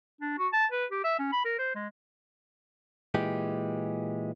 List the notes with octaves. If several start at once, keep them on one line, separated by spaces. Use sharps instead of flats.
D4
F#4
A5
B4
G4
E5
C#4
B5
A#4
C5
G#3
A#2 E3 G#3 G4